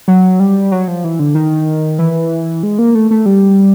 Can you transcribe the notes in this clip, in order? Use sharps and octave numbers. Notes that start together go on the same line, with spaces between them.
F#3
G3
F#3
F3
E3
D3
D#3
E3
G#3
A#3
A3
A3
G3